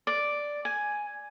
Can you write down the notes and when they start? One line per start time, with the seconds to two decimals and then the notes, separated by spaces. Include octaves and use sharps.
0.07 D5
0.65 G#5